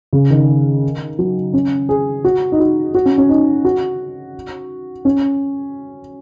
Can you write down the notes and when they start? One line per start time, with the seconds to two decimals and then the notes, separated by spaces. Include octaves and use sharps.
0.13 C#3
0.30 D#3
1.19 F#3
1.54 C#4
1.89 G#4
2.24 F#4
2.52 D#4
2.59 F#4
2.95 F#4
3.06 C#4
3.18 C#4
3.29 D#4
3.65 F#4
5.05 C#4